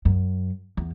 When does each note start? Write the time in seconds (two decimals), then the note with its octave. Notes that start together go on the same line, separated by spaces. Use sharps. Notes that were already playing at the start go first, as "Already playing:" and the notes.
0.05 F#2
0.77 E2